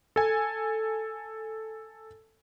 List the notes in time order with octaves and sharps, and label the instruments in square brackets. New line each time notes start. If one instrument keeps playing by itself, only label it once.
[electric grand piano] A4 G#5